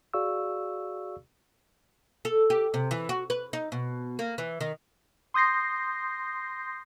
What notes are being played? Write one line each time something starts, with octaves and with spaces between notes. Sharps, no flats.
F#4 G#4 D5 F5 C#6 E6
A4
G4
C3
E3
F#4
B4
D#4
B2
A#3
E3
D#3
C6 D#6 G6 A#6 C7